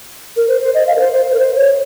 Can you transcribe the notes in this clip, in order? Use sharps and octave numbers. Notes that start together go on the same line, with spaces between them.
A#4
C5
C5
D#5
F5
A#4
C5
C5
C5
A#4
C5
C#5